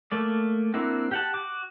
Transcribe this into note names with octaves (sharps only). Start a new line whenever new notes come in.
A3 A#3 D5
A#3 C4 D4 E4 F#4
G4 F#5 A5
F#4 D6